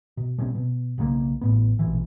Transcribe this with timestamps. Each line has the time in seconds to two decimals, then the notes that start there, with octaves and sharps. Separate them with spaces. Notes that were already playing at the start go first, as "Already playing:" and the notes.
0.17 B2
0.38 B2 G3 C4 C#4
0.55 B2
0.98 B1 C#3 G3 A#3
1.41 A1 A2 B3
1.79 A#1 B2 E3